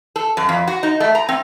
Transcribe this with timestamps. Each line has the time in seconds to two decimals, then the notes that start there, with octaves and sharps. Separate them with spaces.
0.16 A4
0.37 F#2
0.49 F2
0.68 F#4
0.83 D#4
1.00 A3
1.15 A#5
1.29 C4